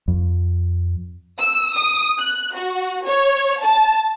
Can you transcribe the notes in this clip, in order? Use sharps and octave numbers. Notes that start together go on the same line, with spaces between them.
F2
E6
D#6
F#6
F#4
C#5
A5